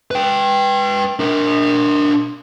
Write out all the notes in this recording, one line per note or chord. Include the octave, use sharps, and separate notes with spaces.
B4 G5
D4 A#4